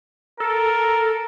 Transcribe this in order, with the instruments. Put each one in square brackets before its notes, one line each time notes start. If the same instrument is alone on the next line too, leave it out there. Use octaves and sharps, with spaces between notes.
[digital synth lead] A4 [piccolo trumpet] A#4